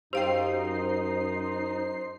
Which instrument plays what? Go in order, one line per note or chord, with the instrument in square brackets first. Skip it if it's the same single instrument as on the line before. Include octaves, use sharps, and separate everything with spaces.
[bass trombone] F#2 [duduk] D#4 [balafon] G4 F5 G5 [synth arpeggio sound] C5 C7